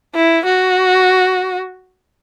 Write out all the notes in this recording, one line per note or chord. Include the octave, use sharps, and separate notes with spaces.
E4
F#4